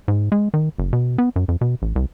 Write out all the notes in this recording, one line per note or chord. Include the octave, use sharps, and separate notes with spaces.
G#2
G#3
D#3
F#1
B2
B3
F#2
F2
B2
A1
C2